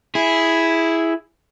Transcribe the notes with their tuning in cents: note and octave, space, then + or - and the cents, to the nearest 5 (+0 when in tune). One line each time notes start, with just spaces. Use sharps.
E4 +0 G#4 +0